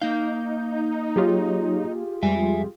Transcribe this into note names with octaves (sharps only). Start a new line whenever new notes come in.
A#3 D#4 F5 G6
F#3 F4 G4 G#4 C#5
F2 G3 G#3 E5 G#5